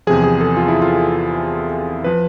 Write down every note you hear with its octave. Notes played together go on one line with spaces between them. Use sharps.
E2 C3 F3 G#4
G#4
A4
F4
E4
F4
F3 B4